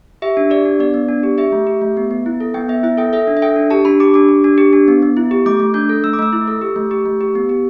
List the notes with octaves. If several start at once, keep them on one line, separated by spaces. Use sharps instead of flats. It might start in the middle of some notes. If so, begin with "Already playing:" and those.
G4 E5
D4
G4 D5
D4
B3 D5
B3
D4
G4
G4 E5
A3
G4
A3
B3
B3
E4
A4
B3 G5
B3 E5
E4 E5
A4 G5
A4 E5
D4
E5
A4 G5
D4
G4 A5
D4 B5
G4 D6
D4 D6
G4
D4
G4
D4
B3
B3
E4
G4
A3 D6
A3
D4 G6
A4
A3 E6
D6
A3 E6
E4
A4
G4
A3
G4
A3
G4
B3
G4